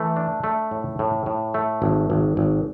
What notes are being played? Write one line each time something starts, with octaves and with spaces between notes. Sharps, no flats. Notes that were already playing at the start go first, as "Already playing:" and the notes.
Already playing: E3 A3
D4
A3
A2
A2
A2
A3
G#1
G#1
G#1